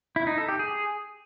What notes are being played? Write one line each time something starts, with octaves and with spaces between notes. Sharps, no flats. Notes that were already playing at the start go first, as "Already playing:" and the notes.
E4
D#4
A4
G4
G#4